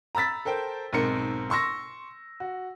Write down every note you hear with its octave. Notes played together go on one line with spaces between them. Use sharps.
A#5 B5 E6 A6 B6
A4 A#4 C5 G5
B1 G#2 C4 A#4 C#7
C6 C#6 E6 A#6
F#4